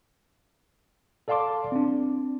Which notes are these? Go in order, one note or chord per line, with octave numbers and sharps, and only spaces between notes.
A4 D5 F5 A5 C6 D6
C4 D4